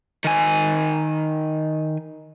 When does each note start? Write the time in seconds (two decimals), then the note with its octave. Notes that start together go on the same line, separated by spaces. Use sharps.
0.24 D#3 G#5